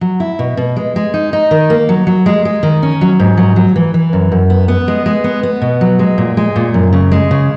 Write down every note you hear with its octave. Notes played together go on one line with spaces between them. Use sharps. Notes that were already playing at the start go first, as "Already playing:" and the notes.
F#3
E4
B2
B2
G#3
G#3
D#4
D#4
D#3
A#3
F#3
F#3
G#3
G#3
D#3
C#4
F#3
G#2
F#3
F#3
E3
E3
F#2
F#2
B3
B3
G#3
G#3
B3
B3
B2
F#3
G#3
A#2
G#3
A#2
F#2
C#3
G#3
C#3